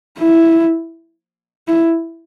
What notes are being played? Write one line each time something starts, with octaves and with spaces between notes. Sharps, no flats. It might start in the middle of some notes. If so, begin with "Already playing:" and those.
E4
E4